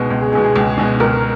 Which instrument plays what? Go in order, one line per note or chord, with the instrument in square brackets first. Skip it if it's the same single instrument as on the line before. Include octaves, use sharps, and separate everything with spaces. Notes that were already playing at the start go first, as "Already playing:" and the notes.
Already playing: [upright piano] C#2 B2 G#3 B3
C#2
[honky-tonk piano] G#4
[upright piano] B2 G#3 B3 [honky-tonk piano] G#4
[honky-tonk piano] G#4
[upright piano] C#2
B2 G#3 B3
[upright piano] C#2 [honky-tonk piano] A#4